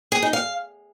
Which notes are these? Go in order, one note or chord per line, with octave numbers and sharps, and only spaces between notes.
G#4
D#4
F5